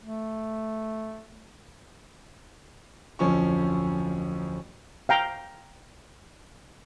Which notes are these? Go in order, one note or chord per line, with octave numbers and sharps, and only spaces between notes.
A3
D1 F2 F3 C#4 C#6
F5 G5 A#5